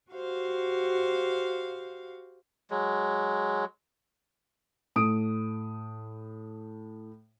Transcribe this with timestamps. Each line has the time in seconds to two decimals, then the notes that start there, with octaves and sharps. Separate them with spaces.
0.12 F#4 G4 C5 F5
2.71 F#3 G#3
4.96 A2 D#6 D7